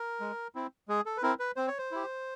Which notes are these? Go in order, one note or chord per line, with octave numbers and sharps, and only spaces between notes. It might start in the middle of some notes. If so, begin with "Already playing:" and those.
Already playing: A#4
G#3
C4 E4
G#3 G#4
A4
B4
C4 E4 A#4
B4
C4 C5
C#5
C5
E4 G4